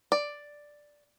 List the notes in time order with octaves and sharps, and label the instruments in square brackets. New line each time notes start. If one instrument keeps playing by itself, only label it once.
[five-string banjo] D5